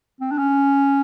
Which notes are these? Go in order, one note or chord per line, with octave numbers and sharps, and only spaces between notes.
C4
D4
C#4